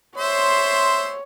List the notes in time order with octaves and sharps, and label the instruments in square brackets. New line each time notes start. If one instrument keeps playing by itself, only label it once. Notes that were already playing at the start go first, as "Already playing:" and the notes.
[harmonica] C5 E5 C6 [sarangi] C#5